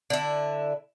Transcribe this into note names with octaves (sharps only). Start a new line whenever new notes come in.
D3 E4